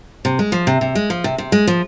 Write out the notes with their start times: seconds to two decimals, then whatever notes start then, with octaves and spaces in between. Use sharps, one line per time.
0.25 C3
0.39 G#3
0.52 F3
0.67 C3
0.81 C3
0.95 G#3
1.10 F3
1.24 C3
1.38 C3
1.52 G#3
1.67 F3